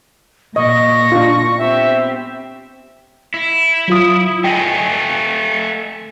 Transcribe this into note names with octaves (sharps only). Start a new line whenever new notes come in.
A#2 D#5 C#6 A#6
D4 F4
B3 C4 G4 E5
E4
F#3 F4 D#6
A3 D#5 G5 G#5